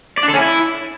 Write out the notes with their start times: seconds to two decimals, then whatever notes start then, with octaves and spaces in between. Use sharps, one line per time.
0.18 D5
0.23 D4
0.28 A4
0.33 C#4
0.39 E4